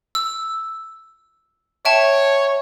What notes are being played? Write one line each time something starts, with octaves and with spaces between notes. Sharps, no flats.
E6
C#5 E5 G5 A5